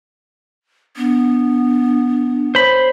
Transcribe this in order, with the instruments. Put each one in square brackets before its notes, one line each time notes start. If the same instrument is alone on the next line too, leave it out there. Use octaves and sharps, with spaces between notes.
[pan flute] B3 [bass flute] D4
[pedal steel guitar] C5 B5 [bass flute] C#5